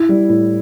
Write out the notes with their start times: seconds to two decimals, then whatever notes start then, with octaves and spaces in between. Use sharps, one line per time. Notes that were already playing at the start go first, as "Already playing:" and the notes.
Already playing: E4
0.09 G3
0.29 A2